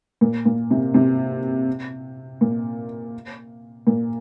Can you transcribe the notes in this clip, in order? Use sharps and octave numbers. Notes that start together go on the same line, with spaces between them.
A#2
A#2
C3
C3
A#2
A#2